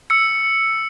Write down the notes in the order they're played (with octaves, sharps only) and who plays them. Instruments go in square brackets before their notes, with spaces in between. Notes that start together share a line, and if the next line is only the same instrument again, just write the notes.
[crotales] E6 C#7